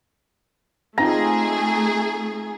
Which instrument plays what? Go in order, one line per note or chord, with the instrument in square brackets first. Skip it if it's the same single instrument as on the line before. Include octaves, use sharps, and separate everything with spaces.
[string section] A3 G#4 [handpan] C4 D#4 F4 [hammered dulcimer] A#5